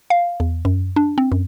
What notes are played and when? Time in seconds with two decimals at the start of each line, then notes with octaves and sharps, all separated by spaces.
0.10 F5
0.40 E2
0.65 F#2
0.96 D4
1.18 C4
1.32 F#2